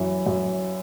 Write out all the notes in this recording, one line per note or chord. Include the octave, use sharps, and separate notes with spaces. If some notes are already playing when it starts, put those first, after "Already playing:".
Already playing: F#2 E3
F#2